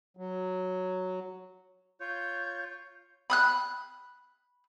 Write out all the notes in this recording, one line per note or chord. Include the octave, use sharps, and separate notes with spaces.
F#3
F4 C#5 G6
B5 D#6 F#6